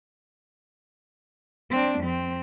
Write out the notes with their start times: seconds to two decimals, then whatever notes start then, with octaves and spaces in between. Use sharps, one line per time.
1.70 C4 D4
1.99 F2 C4